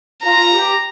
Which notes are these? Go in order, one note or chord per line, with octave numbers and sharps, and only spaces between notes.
F4 A#5
G4